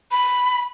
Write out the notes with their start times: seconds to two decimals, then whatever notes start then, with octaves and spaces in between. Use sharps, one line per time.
0.11 B5